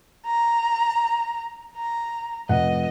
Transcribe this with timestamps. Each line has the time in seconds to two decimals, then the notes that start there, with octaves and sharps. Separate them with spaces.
0.26 A#5
1.77 A#5
2.49 F1 D#5 F#5